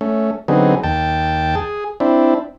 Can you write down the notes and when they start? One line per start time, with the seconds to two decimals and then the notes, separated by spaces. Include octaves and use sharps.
0.01 A3 C#4
0.48 D3 F#3 B3 C4 D#4 G#4
0.83 D#2 G5 A5
1.55 G#4
2.00 C4 D4 E4